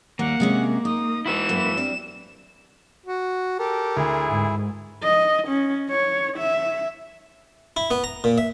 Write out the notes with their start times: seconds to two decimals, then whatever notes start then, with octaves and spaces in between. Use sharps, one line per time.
0.19 D#2 G3 A#3 F#5
0.40 C3 G#3 C#4
0.85 D#4 D#6
1.26 E4 F#4 B4 E7
1.49 F#2 A#3
1.77 G3 C4 D4
3.06 F#4
3.59 G4 A4 A#4
3.97 D2 E4 G#4
4.26 G#2
5.03 D#5
5.47 C#4
5.90 C#5
6.37 E5
7.77 E4
7.91 B3
8.04 A#5
8.24 A#2
8.38 E5